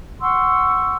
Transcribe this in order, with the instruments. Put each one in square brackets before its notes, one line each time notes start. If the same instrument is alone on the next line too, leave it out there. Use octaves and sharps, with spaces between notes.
[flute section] F#5 C6 C#6 E6